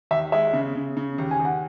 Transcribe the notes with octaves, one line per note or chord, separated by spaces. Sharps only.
D#2 E5
G#3 E5
C#3
C#3
C#3
D#2
G#5
D#2
F#5